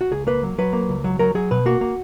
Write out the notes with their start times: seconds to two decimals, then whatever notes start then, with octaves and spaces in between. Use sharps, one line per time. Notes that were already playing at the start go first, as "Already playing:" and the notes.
0.01 F#4
0.11 C#2 G#4
0.27 A#3 B4
0.43 F#3
0.58 F#3 B4
0.73 A#3
0.89 C#2
1.04 F#3
1.19 F#3 A#4
1.35 F#3 G#4
1.51 B2 B4
1.66 A#3 F#4
1.81 A#3